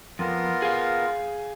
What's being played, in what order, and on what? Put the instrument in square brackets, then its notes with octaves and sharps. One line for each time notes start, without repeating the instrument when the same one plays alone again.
[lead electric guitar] F2 [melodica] B3 F4 A#4
[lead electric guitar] G#4 F5